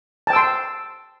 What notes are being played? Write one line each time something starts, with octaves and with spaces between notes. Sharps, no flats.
G5 A5 C6 E6